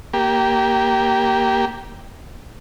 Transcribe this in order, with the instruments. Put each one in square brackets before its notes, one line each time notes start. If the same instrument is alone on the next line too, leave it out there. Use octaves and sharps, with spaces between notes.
[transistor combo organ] A#3 G4